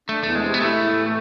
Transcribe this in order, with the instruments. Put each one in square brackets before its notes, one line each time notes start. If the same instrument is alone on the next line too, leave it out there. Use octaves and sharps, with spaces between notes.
[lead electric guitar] A3 [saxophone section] D4
[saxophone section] E2 [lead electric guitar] A3
[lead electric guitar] G#3
[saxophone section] C3
[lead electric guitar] B3
[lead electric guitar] A3 [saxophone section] E4
[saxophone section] A2
E3